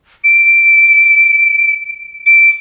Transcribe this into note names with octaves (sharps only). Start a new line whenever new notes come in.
D7
D7